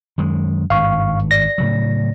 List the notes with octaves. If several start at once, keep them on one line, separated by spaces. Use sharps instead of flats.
F#2 D#3 G#3
G#1 G2 F5 C#6
D5 A#6
A2 C#3 F#3